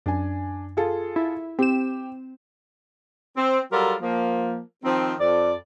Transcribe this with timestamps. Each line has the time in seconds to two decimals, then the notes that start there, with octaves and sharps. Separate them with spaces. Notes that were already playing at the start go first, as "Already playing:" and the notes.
0.06 F#2 D4 G#5
0.77 F4 G#4 A4
1.16 E4
1.59 C4 G4 E7
3.37 C4
3.72 F#3 G3 F4 A4 A#4
4.02 F3 A#3
4.84 D#3 F3 C4
5.21 F2 D5